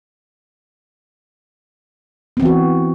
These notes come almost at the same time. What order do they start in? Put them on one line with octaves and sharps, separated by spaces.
B3 C4 E3 F#4